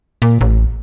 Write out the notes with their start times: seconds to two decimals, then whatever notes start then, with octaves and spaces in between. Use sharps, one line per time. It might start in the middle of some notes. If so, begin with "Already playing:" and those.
0.22 A#2
0.41 A1